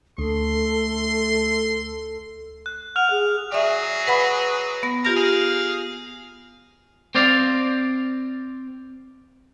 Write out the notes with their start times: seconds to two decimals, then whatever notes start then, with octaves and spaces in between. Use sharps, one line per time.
0.18 D2 A3 A4 C6
2.66 F#6
2.96 F#5 F6 F7
3.10 G#4
3.52 F#3 G#4 D5 E5
4.07 B4 F#5 B5
4.83 B3 A#6
5.05 F4 G4 A#4 A#5 A#6
5.16 G#4 F5
7.15 C4 C5 D5 F5